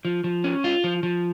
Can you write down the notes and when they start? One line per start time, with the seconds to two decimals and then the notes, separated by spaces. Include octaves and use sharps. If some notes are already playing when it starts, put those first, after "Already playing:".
0.05 F3
0.24 F3
0.44 C#4
0.64 F4
0.84 F3
1.03 F3